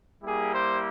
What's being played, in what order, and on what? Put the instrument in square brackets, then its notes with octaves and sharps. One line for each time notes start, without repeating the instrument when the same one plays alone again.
[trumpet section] G3 A#3 E4 G4 G#4
C5